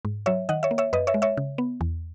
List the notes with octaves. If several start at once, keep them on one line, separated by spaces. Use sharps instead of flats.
G#2
F#3 C#5 E5
D#3 D#5 F#5
C#5 E5
A#3
C#5 E5
F#2 B4 D#5
C#5 E5
G#3
C#5 E5
C#3
B3
E2